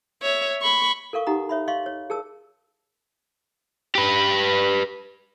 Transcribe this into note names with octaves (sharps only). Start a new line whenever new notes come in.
C#5 E5
B5 C#6
A4 A#4 F5 C#6
D#4 G4 F#5 A#5 D#6
C#5 E5 B5
D#5 F5 C6 C#6
C#5
G#4 A#4 A5 E6
G4 B4